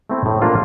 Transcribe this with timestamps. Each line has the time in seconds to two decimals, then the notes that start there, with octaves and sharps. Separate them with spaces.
0.09 A3 C4 E4
0.26 A2
0.42 F3 A#3 D4 F4